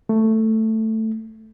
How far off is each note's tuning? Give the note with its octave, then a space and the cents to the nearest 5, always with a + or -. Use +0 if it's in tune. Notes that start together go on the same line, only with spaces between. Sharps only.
A3 +5